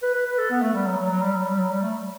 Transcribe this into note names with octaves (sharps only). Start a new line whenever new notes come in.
B4
B4
B4
A4
B3
A3
G3
F#3
F#3
F#3
G3
F#3
G3
F#3
G3
A3